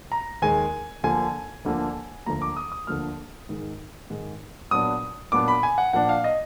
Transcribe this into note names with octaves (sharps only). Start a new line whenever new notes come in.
A#5
D#2 D#3 G#3 G#5
D2 D3 F3 A#3 G#5
D2 D3 F3 A#3
D2 D3 F3 A#3 A#5
D6
D#6
D#6
D2 D3 F3 A#3 F6
G#2 D#3 G#3
G#2 D#3 G#3
A#2 F#3 B3 D4 D#6
A#2 F#3 B3 D4 D6
B5
G#5
F#5
A#2 F3 A#3 D4 F#5
F5
D#5